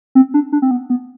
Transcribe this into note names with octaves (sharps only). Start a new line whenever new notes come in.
C4
D4
D4
C4
B3
B3